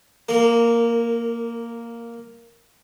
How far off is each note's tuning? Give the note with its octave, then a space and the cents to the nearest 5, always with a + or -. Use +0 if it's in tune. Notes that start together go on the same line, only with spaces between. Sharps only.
A#3 +0 A#4 -25